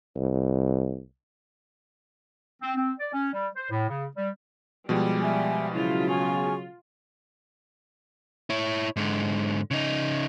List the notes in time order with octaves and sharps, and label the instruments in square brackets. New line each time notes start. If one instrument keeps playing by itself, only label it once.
[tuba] C2
[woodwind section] C4
C4
D5
C#4
G3
C5
A2
C#3
G3
[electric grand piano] B2 F3 G#3 [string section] G3
[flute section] E5 G#5
[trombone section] C#3 F#3 [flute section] E4 [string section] F4
[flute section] G#4 G#5 C#6
[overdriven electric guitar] E4 C#5
G#2 D3
C#3 D#4